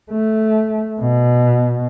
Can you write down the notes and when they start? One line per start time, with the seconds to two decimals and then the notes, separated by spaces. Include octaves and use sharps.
0.11 A3
1.01 B2